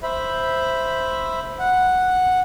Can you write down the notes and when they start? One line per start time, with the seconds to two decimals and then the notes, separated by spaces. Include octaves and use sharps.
0.03 C5 E5 B5
1.59 F#5